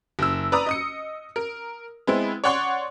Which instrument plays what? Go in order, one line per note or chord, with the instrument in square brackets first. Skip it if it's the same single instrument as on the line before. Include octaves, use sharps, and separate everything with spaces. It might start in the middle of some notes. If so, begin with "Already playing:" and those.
[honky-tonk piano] F#1 E6
B4 D5 A#5 D#6
D#5 D#6 C#7
A#4
G#3 B3 C4 E4
C#5 D5 F#5 C6 C#6